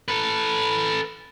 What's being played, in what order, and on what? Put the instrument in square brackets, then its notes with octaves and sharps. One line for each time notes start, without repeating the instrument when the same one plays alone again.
[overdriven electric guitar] A4 B4